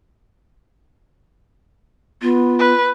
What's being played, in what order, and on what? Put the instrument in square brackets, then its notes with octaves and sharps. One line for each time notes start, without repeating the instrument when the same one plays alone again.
[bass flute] B3 [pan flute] F4
[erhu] B4